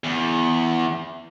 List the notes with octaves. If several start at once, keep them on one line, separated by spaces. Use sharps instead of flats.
E2